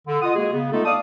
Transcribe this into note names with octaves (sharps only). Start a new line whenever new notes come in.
D3
F4 D#5 F#5 D#6
G#3 A#3 F#4 G#4
C#3 B3
G#3 A3 B3 D#4 F4 A4
D5 F5 A5 D#6